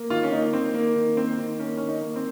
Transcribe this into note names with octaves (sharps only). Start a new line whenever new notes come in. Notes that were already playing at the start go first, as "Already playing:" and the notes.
Already playing: A#3
D#3 F4
C#4
A#3 D#4
D#3 C4
A#3
D#3
A#3 C4
D#3
A#3 C#4
D#3 C#4
D#4
A#3
C4